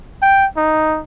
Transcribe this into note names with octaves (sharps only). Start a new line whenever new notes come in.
G5
D#4